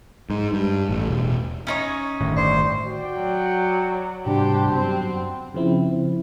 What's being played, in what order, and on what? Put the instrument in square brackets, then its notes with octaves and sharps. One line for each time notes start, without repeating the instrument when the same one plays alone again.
[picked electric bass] G#2
G2
A1
E1
[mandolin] C#4 D#4 C#5
[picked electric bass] G1 A2 D#3
[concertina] C5 [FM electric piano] D5 C#6
[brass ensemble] F#4 D5 G5
[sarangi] F#3
[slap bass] G#2 C3 E3 [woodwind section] G3 D4 [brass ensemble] F#4 C5 [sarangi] G4
[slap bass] F#2 F#3 B3 [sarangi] C4
[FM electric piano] C#3 F3 C4 E4